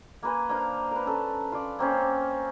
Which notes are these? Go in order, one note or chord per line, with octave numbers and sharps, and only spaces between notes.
A#3 B4 G#5
A#3 D4 C5 F5
A#4 B4
C#4 A4
F4 D5
A#3 C4 C#4